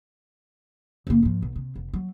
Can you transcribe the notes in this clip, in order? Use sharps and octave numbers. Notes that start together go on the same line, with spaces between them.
F#1 A#3
G#2 F3
B1
C3
F1
F#3